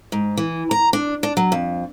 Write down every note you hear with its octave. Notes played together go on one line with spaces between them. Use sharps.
G#2
E3
A#5
D4
D4
F#3
F2